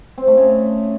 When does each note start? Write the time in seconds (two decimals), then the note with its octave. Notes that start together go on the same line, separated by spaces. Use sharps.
0.18 C4
0.27 A3
0.37 C#3